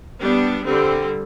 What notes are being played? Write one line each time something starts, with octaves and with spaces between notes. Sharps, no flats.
G3 B3 D4
D3 G3 C4